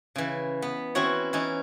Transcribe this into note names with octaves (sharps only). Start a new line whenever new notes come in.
C#3 E3
B3
E3 C4 C#4 E4 F#4 C#5
E3 C#4 D#4